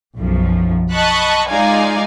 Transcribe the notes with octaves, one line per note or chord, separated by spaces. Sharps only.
B1 F#2 F3
D#5 A5 B5 C#6 F#6
G#3 D#4 F4 D5 F5 G#5